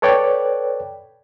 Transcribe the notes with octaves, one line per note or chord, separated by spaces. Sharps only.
A4 B4 C#5 D5 G5